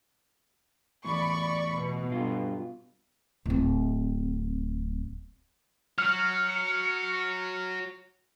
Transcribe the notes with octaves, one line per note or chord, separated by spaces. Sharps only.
E2 A2 D5 B5 C#6
B2
G2 F4
D1 C4
F#3 F6 C#7